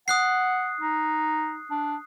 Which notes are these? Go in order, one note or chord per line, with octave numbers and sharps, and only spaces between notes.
F#5 D#6 F#6 C7
D#4
D4